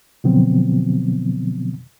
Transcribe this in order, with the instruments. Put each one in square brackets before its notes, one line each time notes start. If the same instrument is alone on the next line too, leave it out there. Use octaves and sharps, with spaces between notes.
[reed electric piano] B2 D3 F3 F#3 B3 C4